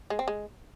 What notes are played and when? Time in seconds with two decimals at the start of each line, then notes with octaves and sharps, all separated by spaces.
0.10 G#3
0.19 C4
0.28 G#3